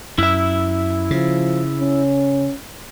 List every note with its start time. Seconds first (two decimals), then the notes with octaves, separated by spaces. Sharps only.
0.18 F#2 E4 E5
1.11 C#3 F3
1.81 C#4